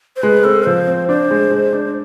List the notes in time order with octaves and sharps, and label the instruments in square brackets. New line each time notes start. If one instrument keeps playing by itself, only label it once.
[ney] C5
[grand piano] G#3 [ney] B4
[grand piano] C4 [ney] A4
[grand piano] F3 [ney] C5
[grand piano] C4
[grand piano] D4 [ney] C5
[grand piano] G#3
G#3
D4